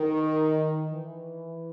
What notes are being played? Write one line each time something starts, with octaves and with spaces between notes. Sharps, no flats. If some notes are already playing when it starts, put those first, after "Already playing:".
Already playing: D#3
E3